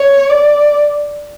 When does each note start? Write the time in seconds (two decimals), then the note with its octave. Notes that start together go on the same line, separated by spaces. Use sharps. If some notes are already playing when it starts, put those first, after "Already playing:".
Already playing: C#5
0.30 D5